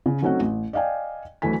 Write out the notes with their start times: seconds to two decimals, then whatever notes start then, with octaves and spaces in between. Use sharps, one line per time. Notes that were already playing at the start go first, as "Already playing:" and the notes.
0.06 C#3
0.22 F#3 A3 C4 C#4 D#4 F#4
0.40 A1
0.73 D5 D#5 F5 G5 G#5
1.42 D2 E3 F#3 A3 G#5 B6